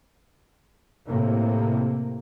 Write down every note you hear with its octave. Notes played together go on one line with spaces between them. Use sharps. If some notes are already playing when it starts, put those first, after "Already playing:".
A2 C3 A#3